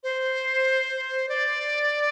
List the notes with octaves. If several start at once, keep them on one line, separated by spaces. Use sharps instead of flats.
C5
D5